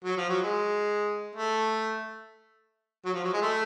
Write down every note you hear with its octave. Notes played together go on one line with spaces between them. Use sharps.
F#3
F3
F#3
G#3
A3
F#3
F3
F#3
G#3
A3